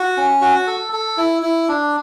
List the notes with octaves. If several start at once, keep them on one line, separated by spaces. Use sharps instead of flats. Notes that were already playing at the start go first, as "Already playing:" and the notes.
Already playing: F#4
C#4
F#4
A4
A4
E4
E4
D4